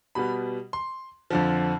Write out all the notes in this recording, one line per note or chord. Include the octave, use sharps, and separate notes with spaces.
B2 G3 B3 B5
C6
F2 D3 F3